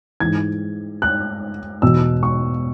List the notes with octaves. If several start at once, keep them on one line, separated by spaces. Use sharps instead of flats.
G#2 E3 G#6
F#6
E2 B2 E6
C#6